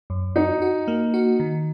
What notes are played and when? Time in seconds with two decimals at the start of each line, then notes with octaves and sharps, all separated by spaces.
0.10 F#2
0.36 D#4 F#4
0.62 F#4
0.88 A#3
1.14 F#4
1.40 D#3